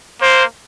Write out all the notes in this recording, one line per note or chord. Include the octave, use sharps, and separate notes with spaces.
A#3 C5